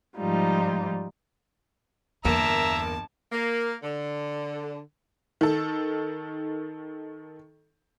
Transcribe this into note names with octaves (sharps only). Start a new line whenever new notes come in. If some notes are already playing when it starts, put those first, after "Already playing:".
G#2 F3 G3 D#4 F4
G1 E2 A#3 E5 A5 A#5
A#3
D3
D#3 A4